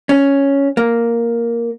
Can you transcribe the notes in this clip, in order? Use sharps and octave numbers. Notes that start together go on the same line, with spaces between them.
C#4
A#3